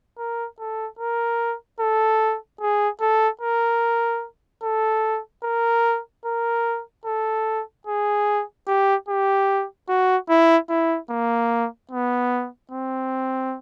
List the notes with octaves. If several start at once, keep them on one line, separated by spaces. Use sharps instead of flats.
A#4
A4
A#4
A4
G#4
A4
A#4
A4
A#4
A#4
A4
G#4
G4
G4
F#4
E4
E4
A#3
B3
C4